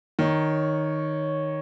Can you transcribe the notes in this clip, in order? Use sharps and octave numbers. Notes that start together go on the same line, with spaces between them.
D#3 C#5